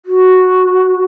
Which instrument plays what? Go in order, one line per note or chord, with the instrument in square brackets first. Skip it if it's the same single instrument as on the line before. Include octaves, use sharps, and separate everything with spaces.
[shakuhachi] F#4